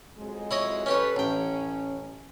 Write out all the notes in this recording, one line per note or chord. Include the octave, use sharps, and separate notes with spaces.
F2 F#3 G#3
E4 C#5 D#5
C#4 G4 A4 B4 C#5
A1 C#4 G5